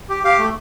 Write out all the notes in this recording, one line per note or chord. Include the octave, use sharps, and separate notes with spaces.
G4
G4 F5
A3